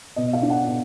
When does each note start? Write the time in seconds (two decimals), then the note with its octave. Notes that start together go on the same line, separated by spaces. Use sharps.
0.16 B2 D#5
0.33 F5
0.42 D4
0.50 F#5
0.67 B2